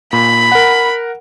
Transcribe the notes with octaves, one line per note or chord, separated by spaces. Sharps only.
A#2 B5
A#4 F#5